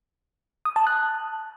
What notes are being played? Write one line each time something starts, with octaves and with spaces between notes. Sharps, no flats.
D#6
A5
F#6